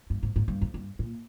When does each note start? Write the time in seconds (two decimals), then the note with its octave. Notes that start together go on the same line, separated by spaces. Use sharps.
0.10 G2
0.23 G#2
0.36 G#2
0.48 G2
0.61 F2
0.74 G2
0.99 A#2